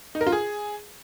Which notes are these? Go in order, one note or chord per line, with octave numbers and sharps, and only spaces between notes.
D#4
A#4
F4
G#4